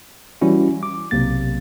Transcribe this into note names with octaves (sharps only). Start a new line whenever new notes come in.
E3 G3 C#4 E4 F#4
D6
B1 C3 A#3 A6